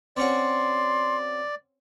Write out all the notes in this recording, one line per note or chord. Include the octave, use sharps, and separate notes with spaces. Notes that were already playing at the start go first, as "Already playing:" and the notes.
C4 C#4 F#4 D5 C6